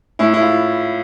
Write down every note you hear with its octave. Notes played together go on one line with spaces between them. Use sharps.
A2 E4
E4
F4